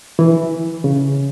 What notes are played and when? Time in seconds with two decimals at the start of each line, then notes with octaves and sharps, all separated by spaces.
0.19 E3
0.84 C#3